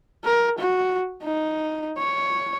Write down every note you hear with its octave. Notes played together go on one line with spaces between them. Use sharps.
A#4
F#4
D#4
C#5